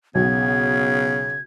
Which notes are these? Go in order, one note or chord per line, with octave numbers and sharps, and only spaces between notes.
B1 C#3 B3 G#6